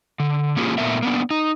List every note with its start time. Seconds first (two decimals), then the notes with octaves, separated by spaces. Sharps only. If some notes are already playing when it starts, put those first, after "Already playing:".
0.20 D3
0.57 A#3 C#4 F4 G4 G#4
0.78 A#2 A3 B3 A#4 E5
1.03 A#3 B3 D4
1.31 D#4